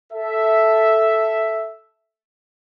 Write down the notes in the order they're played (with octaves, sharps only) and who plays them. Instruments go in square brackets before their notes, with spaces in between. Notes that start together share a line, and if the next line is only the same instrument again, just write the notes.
[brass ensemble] A4 E5